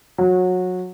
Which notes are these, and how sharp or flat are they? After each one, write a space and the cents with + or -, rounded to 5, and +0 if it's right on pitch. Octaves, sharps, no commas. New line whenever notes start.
F#3 -20